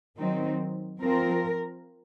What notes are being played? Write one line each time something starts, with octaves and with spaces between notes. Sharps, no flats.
D#3 F#3 C4 D#4
F3 C4 F4 A#4